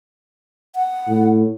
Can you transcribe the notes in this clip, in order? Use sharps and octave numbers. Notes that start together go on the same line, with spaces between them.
F#5
A2